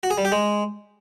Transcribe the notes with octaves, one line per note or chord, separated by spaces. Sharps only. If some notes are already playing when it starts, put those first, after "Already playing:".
F#4
G#4
G3
G4
G#3